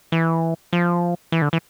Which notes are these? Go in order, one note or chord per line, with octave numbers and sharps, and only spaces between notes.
E3
F3
E3
D3
E3